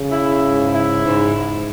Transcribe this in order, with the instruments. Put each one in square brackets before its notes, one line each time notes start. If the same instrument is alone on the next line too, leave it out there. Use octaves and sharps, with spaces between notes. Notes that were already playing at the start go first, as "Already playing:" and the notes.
Already playing: [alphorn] C#3
[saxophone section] E4
G#2
E4
G#2
G#2